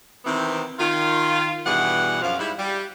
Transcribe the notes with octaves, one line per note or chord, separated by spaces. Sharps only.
C3 D#3 E3 B3 C4
D#3 F4
G2 B2 E3 G3 G#4 F#5
F#2 F3 F5
G#2 G3 G#3 E4
G3